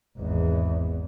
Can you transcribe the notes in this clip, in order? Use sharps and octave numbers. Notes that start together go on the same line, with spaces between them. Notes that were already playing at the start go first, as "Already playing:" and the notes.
G#1 E2